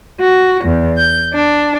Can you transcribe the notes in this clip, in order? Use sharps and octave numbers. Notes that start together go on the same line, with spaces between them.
F#4
E2
G6
D4